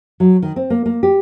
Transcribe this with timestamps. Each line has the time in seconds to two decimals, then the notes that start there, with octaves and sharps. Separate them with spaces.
0.20 F#3
0.42 D#3
0.56 C4
0.70 A#3
0.86 A#3
1.03 G4